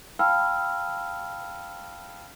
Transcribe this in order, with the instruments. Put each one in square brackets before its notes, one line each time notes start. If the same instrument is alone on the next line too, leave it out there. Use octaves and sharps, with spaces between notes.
[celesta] F5 G5 A5 B5 E6 F6